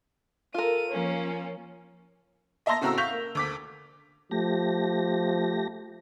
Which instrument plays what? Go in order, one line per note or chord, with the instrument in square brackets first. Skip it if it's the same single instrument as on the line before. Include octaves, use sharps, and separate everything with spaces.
[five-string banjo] F4 A#4 [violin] A4 D#7
[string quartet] F3 A#3 C#4 [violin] C#5
[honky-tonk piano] D#5 E5 A5 A#5 C6 A#6
A2 C#3 C4 F#4 A#5 E6
F5 C#6 G6 B6 F7
A#3
D2 D6 B6
[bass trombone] F3 [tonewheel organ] A3 G4 A#6